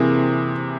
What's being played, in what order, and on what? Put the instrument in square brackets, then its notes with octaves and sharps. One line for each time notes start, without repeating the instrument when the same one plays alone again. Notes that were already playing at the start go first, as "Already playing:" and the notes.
Already playing: [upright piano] C3 E3 A#3 E4 G#4 [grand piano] C4